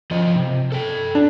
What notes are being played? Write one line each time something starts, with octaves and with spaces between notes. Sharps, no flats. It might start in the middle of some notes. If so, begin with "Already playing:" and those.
F3 D#5
C3
A4 G5
D4